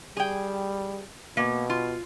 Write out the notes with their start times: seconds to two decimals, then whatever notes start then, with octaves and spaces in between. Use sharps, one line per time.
0.17 G3 G#4 G5
1.37 B2 A#3
1.70 F4